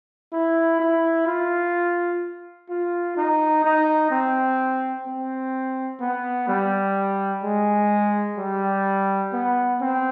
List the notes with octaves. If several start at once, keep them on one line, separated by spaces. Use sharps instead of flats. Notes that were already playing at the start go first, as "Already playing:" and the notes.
E4
E4
F4
F4
D#4
D#4
C4
C4
B3
G3
G#3
G3
B3
C4